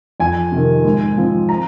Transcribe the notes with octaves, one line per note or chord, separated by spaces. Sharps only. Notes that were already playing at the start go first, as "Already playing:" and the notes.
F2 G#5
C3 D#3
G#2
F3 C4
A#5